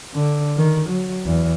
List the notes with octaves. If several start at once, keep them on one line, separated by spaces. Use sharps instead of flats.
D3
D#3
F#3
E2